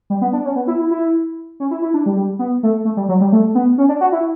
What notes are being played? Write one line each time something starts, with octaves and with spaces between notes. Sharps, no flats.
G3
B3
D4
C#4
B3
E4
E4
E4
C#4
E4
E4
D4
G3
G3
B3
A3
A3
G3
F#3
G3
A3
B3
C#4
D4
F#4
E4